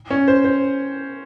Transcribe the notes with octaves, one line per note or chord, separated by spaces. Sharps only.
C#4
C5
C5